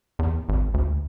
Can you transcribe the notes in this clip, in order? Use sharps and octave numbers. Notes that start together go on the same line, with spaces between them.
E2
G#1
D2